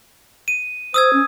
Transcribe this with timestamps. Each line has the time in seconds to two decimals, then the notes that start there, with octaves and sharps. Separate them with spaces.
0.48 D#7
0.94 C5 D#6 E6 G#6
1.13 C#4